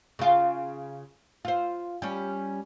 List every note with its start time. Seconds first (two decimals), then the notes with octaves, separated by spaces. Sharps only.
0.19 C#3 F4
1.45 F4 C5
2.02 G3 C#4